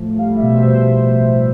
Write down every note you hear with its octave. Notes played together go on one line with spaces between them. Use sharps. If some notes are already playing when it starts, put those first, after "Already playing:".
Already playing: A2 F3
G3 F5
E5
B2
C5